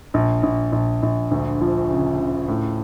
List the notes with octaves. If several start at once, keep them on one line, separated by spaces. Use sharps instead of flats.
A#1
A#1
A#1
A#1
D2
F3
C#3
C#3
A2